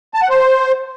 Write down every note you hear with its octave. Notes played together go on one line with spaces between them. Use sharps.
A5
F#5
C5